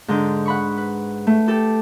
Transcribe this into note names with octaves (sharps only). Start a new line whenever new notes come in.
G#2 D3 G6
F#5 B5 C#6
B4
A3
G4 A4